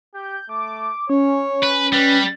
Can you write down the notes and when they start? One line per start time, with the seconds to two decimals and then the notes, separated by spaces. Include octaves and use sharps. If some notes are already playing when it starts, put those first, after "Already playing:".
0.14 G4 G6
0.49 A3 D6
1.10 C#4 C#5
1.63 B4
1.93 G3 B4